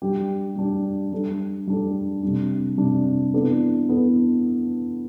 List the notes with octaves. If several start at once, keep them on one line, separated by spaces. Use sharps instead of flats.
G3 D4 G4
G3 D4 G4
G3 D4 A4
G3 D4 A4
C3 G3 D4
C3 G3 D4
E3 B3 D4 A4
E3 B3 D4 A4